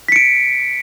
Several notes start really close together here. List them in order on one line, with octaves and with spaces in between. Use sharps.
B6 C#7 D7